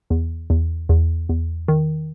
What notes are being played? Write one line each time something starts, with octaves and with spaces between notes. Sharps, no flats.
E2
E2
E2
E2
D#3